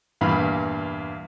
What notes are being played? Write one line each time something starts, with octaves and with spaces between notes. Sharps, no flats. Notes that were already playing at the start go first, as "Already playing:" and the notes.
E2 G2 A#2 F5 B5